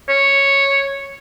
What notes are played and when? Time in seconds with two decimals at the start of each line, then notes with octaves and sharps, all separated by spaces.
0.09 C#5